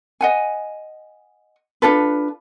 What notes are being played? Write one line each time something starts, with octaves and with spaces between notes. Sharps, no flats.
D#5 F#5 G#5
D4 F4 A4 B4